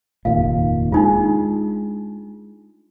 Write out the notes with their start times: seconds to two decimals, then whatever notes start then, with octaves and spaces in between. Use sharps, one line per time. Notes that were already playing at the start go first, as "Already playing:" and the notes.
0.25 F1 D#2 A#2 F5
0.92 G#3 D4 D#4 F4